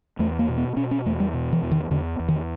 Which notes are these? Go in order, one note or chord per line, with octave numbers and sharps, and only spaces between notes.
E2 A3
A#3
B2
B3
B2 C#4
C#4
E2 A3
G3
B2
E3
E2
D#3
E2 D3
E2
D#3